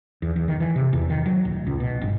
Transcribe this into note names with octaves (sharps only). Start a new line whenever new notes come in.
E2
E2
D#3
E3
C3
E2
D#3
F#3
D1
C#2
B2
G1